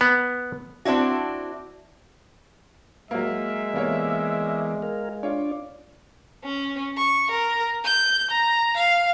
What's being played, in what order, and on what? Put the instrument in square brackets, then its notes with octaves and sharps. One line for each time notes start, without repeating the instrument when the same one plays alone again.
[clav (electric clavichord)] B3
[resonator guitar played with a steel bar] C4 D4 E4 F#4
[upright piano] F#3 A#3 [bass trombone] G#3 [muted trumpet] E5
[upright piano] C3 A#3 C#5 [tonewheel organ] E3 B3 D5
[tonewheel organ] G#4 A#4 F5
[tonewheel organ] D4 D5 [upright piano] F4 C#5
[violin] C#4
C#6
A#4
G6
A#5
F5